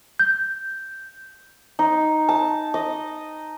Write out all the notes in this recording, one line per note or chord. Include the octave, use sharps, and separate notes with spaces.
G6
D#4
A5
D#5